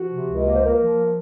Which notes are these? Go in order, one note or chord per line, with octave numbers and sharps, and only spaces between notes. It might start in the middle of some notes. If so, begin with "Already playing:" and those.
Already playing: F3 F#4
C3
C#2
A#3
C5
A#3 A#4
F3